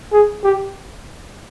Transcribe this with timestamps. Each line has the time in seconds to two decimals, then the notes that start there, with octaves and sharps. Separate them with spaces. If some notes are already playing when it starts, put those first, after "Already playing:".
0.13 G#4
0.44 G4